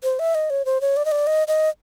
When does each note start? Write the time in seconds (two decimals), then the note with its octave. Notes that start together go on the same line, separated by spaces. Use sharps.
0.03 C5
0.19 E5
0.35 D#5
0.50 C#5
0.65 C5
0.81 C#5
0.97 D5
1.05 D#5
1.12 D5
1.27 D#5
1.48 D#5